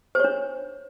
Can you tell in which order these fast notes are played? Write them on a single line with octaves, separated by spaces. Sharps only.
C5 C#5 D4